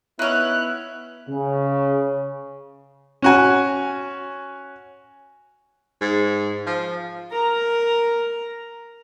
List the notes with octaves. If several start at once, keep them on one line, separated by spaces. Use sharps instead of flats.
D#3 B3 C#4 E4 F#6
C#3
C#4 F#4 G#5
G#2
F3
A#4 A#5